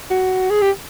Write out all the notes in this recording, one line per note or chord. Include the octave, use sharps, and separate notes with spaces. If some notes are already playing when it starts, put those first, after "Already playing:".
F#4
G#4
G4